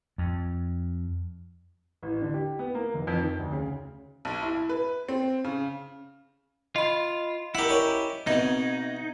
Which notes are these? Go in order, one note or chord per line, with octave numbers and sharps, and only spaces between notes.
F2
A1
D3
G4
B3
A#3
F1
F2
D#3
D2
C#3
B1
E4
B4
C4
C#3
F4 D#5 B5
E4 G4 A#4 F#5
C#4 A#4
B2 C4 D#4 E5 G#6